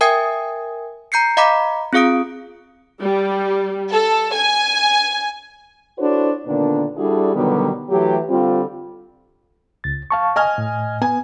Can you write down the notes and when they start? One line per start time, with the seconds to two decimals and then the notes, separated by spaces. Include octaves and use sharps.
0.01 A#4 E5 G5 G#5 D#6 G#6
1.12 A#5 G6 C7 C#7
1.37 D#5 F5 A#5 B5 D6 B6
1.93 C4 F4 G#4 F5 D#6 D7
3.03 G3
3.92 A4
4.35 G#5
5.99 D4 E4 F#4 A4 C5 C#5
6.46 A#2 D3 D#3 B3 D4
6.97 G3 D4 E4 F#4 G#4 A4
7.35 B2 D3 D#3 F#3 G3 B3
7.90 E3 F#3 A3 G4
8.29 D3 G3 C4 F4
9.84 C#2 A6
10.11 F5 A5 C#6
10.36 D#5 G#5 F6
10.58 A2
11.02 B3 G#5